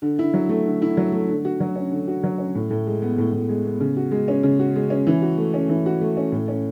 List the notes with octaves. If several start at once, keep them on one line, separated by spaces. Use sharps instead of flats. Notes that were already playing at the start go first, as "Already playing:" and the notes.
D3
E4
F#3
A3
D3
E4
F#3
A3
D3
F#4
F#3
C#4
D3
F#4
F#3
C#4
A2
A2
G#3
B3
A2
A2
G#3
B3
C#3
F#4
G#3
C#4
C#3
F#4
G#3
C#4
E3
F#4
A3
C#4
E3
F#4
A3
C#4
A2
C#4